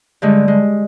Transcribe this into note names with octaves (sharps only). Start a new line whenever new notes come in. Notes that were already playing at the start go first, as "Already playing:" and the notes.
G2 D3 G3 G#3
G#3